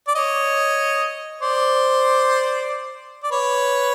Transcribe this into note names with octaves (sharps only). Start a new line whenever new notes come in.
D5
C#5 D#5
C5 D5
D5
B4 C#5